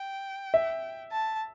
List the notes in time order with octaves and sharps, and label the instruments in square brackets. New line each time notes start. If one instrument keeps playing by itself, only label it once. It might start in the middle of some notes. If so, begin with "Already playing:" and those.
Already playing: [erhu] G5
[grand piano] E5
[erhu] A5